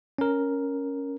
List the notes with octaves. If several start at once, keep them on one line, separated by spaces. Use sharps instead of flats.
C#4 A#4